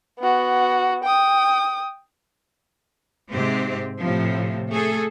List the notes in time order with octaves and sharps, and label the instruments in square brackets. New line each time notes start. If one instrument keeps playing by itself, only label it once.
[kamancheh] B3 F#4
G5 D#6
[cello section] G#2 C3 G#3 C4 G4
A2 C3 F3
A3 G#4 A4